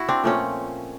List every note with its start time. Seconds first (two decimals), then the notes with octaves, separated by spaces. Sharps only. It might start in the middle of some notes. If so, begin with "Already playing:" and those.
Already playing: E4 F#4
0.08 C4 D4
0.24 A#2 F3 A3 C4 C#4